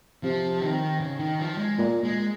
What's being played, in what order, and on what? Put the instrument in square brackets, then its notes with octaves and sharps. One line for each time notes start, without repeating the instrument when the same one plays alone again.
[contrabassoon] C3 [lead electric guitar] F3
[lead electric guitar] D#3
C#3
D#3
F3
G#3
[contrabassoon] A#2
[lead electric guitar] G#3